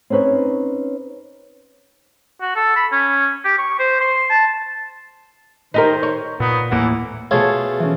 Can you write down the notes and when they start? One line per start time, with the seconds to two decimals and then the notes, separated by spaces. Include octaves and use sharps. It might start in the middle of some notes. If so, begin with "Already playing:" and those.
0.10 C4 C#4 D#4 B4 C#5
2.41 F#4
2.56 A4
2.76 B5
2.92 C#4
3.45 G4
3.58 C#6
3.79 C5
4.01 C6
4.30 A5
5.74 D#3 D#4 G4 A#4 C5
6.03 C#5
6.40 A#2 B3 D#4
6.71 D#1 A2 E3 A#3 F#5
7.31 B2 A3 F4 G#4 A4 C#5
7.80 E3 C#4